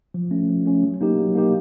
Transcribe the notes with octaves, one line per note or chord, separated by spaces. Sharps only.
F3
A3 C#4
F3
A3 C#4
F#3
A#3 D#4 G4
F#3
A#3 D#4 G4